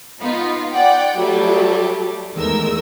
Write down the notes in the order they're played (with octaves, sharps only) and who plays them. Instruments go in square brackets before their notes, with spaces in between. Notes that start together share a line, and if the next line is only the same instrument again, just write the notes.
[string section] B3 D#4 F4
D5 F#5 G5
F#3 G3 A3
E2 D#3 G#3 A3 A#4 E6